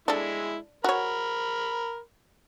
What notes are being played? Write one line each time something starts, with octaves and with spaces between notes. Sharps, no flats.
G#3 D4 E4 A4
F#4 A#4 C#5 B5